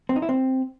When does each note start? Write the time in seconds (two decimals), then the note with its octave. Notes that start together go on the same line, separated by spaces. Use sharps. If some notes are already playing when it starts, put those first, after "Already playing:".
0.09 C4
0.16 D#4
0.22 E4
0.29 C4